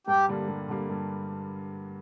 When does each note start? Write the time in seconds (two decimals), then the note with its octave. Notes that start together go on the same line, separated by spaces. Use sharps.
0.07 G2 G4
0.29 D3 G3 A#3
0.48 G2
0.69 D3 G3 A#3
0.89 G2